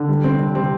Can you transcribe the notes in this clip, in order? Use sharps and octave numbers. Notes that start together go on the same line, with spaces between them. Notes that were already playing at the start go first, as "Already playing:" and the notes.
Already playing: D3
G3
C3 C4
G3 C4
C3 C4